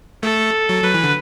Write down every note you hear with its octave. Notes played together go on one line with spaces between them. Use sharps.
A3 A4
F#3
F#3 B4
E3
D3